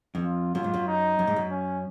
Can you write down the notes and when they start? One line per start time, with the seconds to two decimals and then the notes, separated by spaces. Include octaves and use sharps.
0.15 F2
0.24 F4
0.54 F#2 F4
0.64 G#2
0.74 F#2
0.87 D#4
1.19 F#2
1.27 G#2
1.36 F#2
1.50 C#4